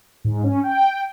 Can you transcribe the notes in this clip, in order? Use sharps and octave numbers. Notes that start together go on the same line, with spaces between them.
G#2
C#4
G5